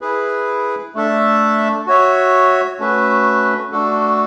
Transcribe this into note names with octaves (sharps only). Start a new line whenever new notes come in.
E4 G#4 B4
A3 D4 A4 E5
F#4 C#5 E5
A3 C#4 F#4 B4 E5
A3 D4 F#4 A4